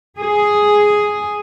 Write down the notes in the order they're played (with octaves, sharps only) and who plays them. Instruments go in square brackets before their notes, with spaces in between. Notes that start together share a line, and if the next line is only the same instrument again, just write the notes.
[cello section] G#4